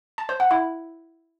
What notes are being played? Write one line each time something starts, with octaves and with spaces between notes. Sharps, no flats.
A5
C5
F#5
E4